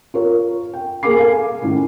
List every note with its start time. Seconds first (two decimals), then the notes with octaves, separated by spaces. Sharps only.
0.14 F4 A#4 C#5
0.74 G5
1.03 A#3 G#4 A#4 G#5 D6 C7
1.18 A4 F5 G#5
1.62 A2 D#3 C#4